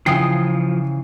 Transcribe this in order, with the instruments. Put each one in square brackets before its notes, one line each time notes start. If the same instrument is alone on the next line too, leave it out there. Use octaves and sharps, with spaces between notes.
[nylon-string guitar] C#3 E3 G5 [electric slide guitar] F3 [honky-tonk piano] D#6 C7